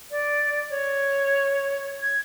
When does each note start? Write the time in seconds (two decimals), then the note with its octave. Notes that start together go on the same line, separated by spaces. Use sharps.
0.11 D5
0.70 C#5
2.01 G#6